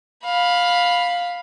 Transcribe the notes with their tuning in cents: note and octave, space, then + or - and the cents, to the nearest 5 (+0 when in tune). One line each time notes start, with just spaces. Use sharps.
F5 +15 B5 +0